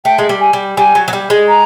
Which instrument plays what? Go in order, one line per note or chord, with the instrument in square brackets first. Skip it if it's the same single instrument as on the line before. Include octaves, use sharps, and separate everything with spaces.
[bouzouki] A3 [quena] G5
[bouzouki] G#3
G3
[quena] G#5
[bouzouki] G3
[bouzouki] G3 [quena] G#5
[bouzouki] F#3
F#3
G3
G#3
[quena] A#5